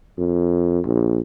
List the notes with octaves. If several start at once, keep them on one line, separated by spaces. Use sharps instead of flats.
F2
A#1